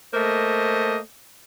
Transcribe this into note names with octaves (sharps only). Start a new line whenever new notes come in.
A3 A#3 C5 D#5